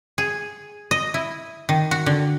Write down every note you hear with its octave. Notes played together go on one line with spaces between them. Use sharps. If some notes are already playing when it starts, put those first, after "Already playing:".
G#4
D#5
E4
D#3
F#4
D3